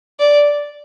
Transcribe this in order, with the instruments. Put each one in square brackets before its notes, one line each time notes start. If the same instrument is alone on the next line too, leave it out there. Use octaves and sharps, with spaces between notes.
[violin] D5